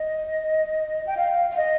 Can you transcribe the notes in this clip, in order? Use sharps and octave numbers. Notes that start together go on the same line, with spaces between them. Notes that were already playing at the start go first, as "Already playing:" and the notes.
Already playing: D#5
G5
F5
F5
D#5